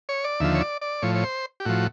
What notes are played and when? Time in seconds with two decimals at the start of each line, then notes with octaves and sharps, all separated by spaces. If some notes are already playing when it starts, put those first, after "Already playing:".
0.09 C#5
0.24 D5
0.40 D#2 D3 F3 E5
0.54 C#5
0.61 D5
0.81 D5
1.02 A2 F3 C#5
1.15 C#5
1.24 C5
1.60 G4
1.65 A2 F3 F#4